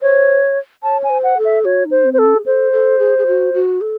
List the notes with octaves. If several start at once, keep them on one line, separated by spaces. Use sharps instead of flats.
C5 C#5
C#5 A5
G#5
C5
F#5
A4
E5
F#4 C#5
D#4
C5
C4
C5
A4
C#4
G#4
A4 C5
A4
G#4
G#4
F#4
F#4
A4